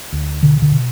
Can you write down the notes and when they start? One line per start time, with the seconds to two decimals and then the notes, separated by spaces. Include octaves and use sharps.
0.13 D2
0.42 B2 D3
0.62 D3
0.72 B2